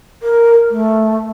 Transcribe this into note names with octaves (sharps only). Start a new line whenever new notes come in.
A#4
A3